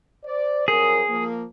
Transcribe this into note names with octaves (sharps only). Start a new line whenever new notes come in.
C5 D5
F2 F#3 G#4 A#4
F3 A#3